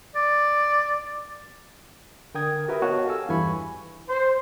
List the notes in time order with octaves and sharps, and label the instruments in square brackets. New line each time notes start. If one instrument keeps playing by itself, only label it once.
[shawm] D5
[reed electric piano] D3 A#4 G5 D#6 G#6
F#4 G4 A#4 B4 E5
B3 F#4 C#5 D#5 F5 A5
G4 A4 F5 G#5 E6
E2 G2 E3 G#5 B5 C#6
[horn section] C5